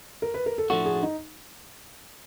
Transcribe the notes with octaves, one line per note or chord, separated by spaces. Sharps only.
A#4
B4
A#4
A4
A2 F3 A3 D4 F#4 A4
G#4
D#4